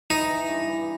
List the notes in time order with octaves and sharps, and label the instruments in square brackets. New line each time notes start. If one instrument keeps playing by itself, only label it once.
[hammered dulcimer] E3 [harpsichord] D#4
[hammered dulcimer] E3
G2
E3